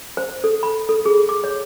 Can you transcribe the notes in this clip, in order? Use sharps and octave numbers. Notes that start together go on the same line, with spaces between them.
C5
A4
B5
A4
G#4
D6
C#5